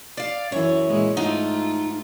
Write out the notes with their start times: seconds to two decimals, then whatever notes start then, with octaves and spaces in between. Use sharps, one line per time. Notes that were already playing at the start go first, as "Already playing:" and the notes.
0.17 D5 F5
0.52 F#2 E3 C#5
0.88 A#2 E3 G#3
1.17 G#2 A3 D#4 F4 F#5